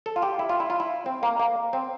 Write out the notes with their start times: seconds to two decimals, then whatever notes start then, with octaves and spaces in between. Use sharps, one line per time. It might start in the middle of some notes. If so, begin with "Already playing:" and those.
0.06 A4
0.16 F4
0.22 G4
0.39 E4
0.49 F4
0.60 E4
0.70 F4
0.80 E4
1.06 C4
1.23 A#3
1.40 A#3
1.73 C4